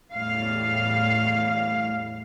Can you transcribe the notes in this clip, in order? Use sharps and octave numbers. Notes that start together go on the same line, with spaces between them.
E2 A2 G3 F5